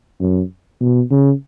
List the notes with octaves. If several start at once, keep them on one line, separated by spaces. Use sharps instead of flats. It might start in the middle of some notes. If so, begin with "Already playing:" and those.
F#2
B2
C#3